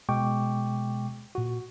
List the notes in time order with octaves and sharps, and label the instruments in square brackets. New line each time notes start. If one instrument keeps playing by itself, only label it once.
[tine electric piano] B2 G#3 G5 C#6 D6
A#2 F#4